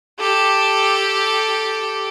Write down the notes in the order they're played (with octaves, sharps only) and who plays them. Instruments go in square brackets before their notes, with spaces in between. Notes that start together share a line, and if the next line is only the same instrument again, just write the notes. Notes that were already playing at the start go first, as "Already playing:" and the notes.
[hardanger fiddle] G4 A4